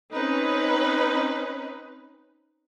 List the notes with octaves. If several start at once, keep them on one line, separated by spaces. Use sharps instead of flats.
C4 C#4 D#4 B4